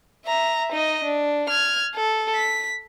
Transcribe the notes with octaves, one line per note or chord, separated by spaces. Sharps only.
E5 A#5
D#4 D#5
D4
F6 G#6
A4
B6